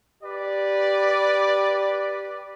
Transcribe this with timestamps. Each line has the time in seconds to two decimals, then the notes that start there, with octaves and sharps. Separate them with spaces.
0.24 G4 B4 D5